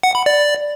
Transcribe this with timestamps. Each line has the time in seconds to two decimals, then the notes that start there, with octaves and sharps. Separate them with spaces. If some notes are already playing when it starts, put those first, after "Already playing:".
0.03 F#5
0.15 B5
0.26 D5